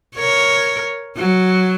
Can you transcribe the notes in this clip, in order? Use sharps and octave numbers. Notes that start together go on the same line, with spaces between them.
A#4 C#5
F#3